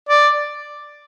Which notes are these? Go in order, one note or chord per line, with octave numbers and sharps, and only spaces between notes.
D5